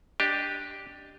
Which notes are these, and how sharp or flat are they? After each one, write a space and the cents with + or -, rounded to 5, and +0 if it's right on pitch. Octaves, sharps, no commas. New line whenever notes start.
D4 +0 G4 +0 D#5 -15